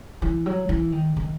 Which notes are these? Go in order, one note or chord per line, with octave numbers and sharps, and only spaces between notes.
E3
F#3
E3
D#3
D#3